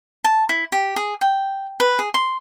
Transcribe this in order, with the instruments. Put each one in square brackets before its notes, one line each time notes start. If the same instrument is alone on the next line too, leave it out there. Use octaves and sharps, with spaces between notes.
[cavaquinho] A5
E4
G4
G#4
G5
B4
G#4
C6